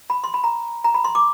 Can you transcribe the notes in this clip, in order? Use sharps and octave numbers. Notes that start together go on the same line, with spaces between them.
B5
C6
B5
A#5
A#5
B5
C6
D6